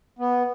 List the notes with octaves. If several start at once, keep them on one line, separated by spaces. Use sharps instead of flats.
B3